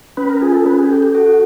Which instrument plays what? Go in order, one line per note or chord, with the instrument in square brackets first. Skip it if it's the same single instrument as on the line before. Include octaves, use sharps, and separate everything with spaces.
[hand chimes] C#4 [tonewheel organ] B4
[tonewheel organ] A#4
[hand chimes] F4 [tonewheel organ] G#4
[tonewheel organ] A4
[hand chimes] C#4 [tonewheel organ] B4
[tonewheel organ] G#4
[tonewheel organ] G4 [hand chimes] A4
[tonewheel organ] G4
[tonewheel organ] F#4 [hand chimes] A4